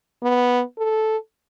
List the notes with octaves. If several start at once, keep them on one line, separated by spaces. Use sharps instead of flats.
B3
A4